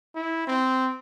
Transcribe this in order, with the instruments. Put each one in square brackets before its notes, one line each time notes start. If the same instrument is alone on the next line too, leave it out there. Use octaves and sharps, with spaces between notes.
[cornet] E4
C4